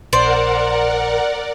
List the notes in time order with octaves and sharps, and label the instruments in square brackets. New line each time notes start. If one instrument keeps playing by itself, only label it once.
[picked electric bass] A#1 [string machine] A#4 F#5 [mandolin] C5 [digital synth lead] D5